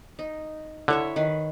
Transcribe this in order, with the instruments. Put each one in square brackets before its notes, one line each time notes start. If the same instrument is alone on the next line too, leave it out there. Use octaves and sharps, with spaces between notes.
[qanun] D#4
[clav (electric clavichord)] D3 [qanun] E4 C#5 E5
[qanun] D#3 B4